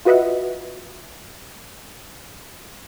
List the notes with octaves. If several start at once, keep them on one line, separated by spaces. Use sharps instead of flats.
F4 F#4 B4 D#5 E5 F#5